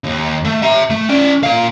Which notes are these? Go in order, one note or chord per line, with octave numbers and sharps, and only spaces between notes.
D#2
A3
E5 A#5
A3
C#4 D5
A#2 F5